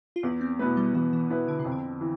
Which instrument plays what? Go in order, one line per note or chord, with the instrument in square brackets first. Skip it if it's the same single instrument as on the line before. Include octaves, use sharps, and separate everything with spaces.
[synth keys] F4
[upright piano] E2 [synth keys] E4
[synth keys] C4
[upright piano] B2 B3 E4 B4 [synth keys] A3
[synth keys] G3
[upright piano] E2 [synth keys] E3
[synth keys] E3
[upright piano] B2 B3 E4 B4
[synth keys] D3
C3
[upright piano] F2
[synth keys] D3
[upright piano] E3